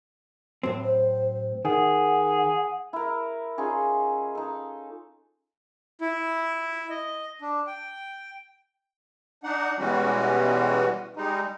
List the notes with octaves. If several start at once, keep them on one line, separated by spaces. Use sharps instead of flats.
A2 F#3 C4
C5
D#3 G#4 F#5
E4 A#4
C#4 D#4 F4 G#4
D#4 A4
E4
D#5
D4
G5
D4 D#4 F#5
B2 E3 G3 G#3 C#4 F#4
G3 G#3 D#4